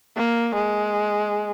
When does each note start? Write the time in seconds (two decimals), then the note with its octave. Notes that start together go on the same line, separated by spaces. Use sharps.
0.17 A#3
0.55 G#3